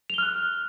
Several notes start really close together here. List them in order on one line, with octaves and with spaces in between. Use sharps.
F7 G7 F6 F#6